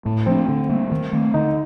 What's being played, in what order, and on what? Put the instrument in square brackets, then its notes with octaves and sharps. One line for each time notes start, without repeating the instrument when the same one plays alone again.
[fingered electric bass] A2 [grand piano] A3
[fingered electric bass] F3 A#3 D4 [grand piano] C4
[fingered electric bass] D3
G3 A#3
D#3
A3 C4
[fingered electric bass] D3 [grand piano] D#4